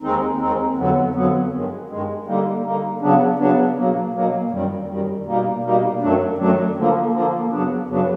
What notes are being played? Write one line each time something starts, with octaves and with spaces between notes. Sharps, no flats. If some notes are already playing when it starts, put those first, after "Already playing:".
D#2 D#3 G#3 C4 D#4
D#2 D#3 G#3 C4 D#4
F2 D3 F#3 B3
F2 D3 F#3 B3
G2 D#3 G#3
G2 D#3 G#3
D3 G3 A#3 D#4
D3 G3 A#3 D#4
C#3 F#3 B3 D4
C#3 F#3 B3 D4
B2 F#3 A#3
B2 F#3 A#3
F#2 D#3 G3
F#2 D#3 G3
B2 G3 A#3 D#4
B2 G3 A#3 D#4
F#2 D#3 F#3 A3 D4
F#2 D#3 F#3 A3 D4
D3 F3 A#3
D3 F3 A#3
F#2 C#3 F#3 B3 D4
F#2 C#3 F#3 B3 D4